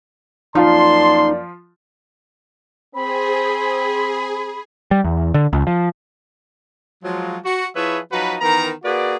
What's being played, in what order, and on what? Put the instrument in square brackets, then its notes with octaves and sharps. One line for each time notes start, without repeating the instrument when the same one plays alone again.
[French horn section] F#2 A#3 D5 [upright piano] F3 F4 [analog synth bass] D#4 [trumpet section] A5 C6
[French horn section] C4 C5 [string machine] G#4 [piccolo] B5
[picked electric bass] G3
E2
D3
C#2
F3
[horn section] F3 F#3 G#3
F#4
F3 E4 G#4 B4 C#5 E5
F3 F#3 D#4 F#4 B4
D#3 E3 B3 A#4 A#5
A#3 F#4 G#4 B4 D5